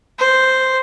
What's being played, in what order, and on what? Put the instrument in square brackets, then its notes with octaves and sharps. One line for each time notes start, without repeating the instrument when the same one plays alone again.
[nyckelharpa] C5